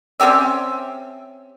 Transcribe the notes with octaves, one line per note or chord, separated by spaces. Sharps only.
C4 C#4 G4 E5